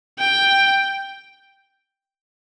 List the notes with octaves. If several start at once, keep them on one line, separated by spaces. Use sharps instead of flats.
G5